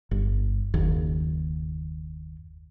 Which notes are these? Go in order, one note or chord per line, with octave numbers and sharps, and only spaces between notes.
G1
F#1 D#2